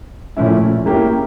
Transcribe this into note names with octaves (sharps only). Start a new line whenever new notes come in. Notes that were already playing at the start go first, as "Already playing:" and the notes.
A#2 F3 A3 C#4 E4
A#3 C#4 E4 G4